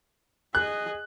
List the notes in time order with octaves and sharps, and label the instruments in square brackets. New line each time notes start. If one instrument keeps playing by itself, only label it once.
[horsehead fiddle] G#4 D#5 [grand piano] F#6